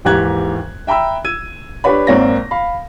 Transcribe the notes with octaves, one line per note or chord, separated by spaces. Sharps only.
D#2 G#2 E3 G4 F#6 G#6
E5 G5 A#5 B5 E6
E6 G#6 D#7
D4 G4 B4 C#5 B5
G#1 A#3 C4 C#5 D5 A#6
F5 B5